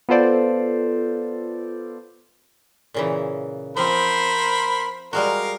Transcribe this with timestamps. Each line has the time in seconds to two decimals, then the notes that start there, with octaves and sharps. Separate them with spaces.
0.09 B3 F4 A4 C5 D5
2.94 A#2 C#3 E3
3.77 F3 C4 A#4 C5 B5
5.13 G3 G#3 F#4 A#4 F5